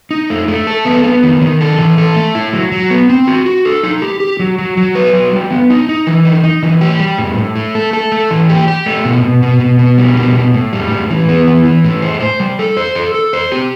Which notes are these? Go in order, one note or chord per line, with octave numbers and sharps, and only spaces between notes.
D#4
A3
A3
A4
B3
B3
D#3
D#3
A4
E3
A4
A3
E4
F#3
F#3
B3
C4
F#4
F#4
A4
D#4
G4
G4
F#3
F#3
F#3
B4
F#3
G3
B3
D#4
D#4
E3
D#4
D#4
E3
G4
G3
A2
A2
A3
A4
A4
A3
E3
G4
G4
A3
B2
B2
B2
B2
B2
G3
B2
B2
A2
G3
A2
E3
B3
E3
E3
A2
C5
C5
G3
A4
C5
A4
A4
C5
G4